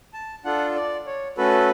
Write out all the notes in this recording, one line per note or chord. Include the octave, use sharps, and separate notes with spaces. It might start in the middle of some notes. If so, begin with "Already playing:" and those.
A5
D4 F4 A4 F#5
D5
C#5
A3 C#4 F#4 A4 B4